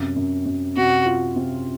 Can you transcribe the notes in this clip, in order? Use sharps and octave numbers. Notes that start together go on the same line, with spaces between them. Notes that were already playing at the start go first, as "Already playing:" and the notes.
Already playing: F#2 C3
F#2
F#2
C3 F#4
F4
C3